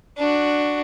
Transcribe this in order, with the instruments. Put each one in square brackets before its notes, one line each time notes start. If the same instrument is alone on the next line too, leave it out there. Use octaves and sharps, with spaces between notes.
[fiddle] D4 F#4